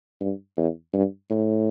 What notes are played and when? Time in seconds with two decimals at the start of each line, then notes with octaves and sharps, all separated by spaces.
0.21 G2
0.57 E2
0.93 G2
1.30 A2